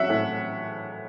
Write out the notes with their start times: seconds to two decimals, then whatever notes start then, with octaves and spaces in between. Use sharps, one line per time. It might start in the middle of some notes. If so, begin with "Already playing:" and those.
Already playing: F#3 C#4 E5 F#5
0.09 A2